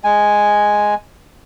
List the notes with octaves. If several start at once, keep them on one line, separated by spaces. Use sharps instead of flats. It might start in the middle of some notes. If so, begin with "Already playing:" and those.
G#3 G#5